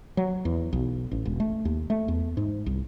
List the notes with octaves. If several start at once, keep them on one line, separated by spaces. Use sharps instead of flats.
F#3
E2
B1
A1
E1
A3
D#2
A3
E2
G#2
C2